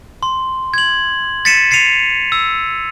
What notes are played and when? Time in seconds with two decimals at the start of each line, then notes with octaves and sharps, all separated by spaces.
0.23 C6
0.74 G#6 F#7
1.45 A6 B6 C#7 D#7 E7
1.71 A6 C7 C#7 D#7 F7
2.32 E6